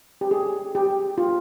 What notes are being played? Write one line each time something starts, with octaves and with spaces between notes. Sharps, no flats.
G4
G#4
G4
F4